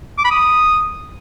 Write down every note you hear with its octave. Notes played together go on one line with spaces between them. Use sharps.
D6
B5
D#6